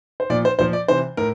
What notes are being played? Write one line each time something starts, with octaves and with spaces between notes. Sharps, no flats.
C5
A#2 F3 D5
C5
A#2 F3 C5
D5
C3 E3 C5
A2 A#4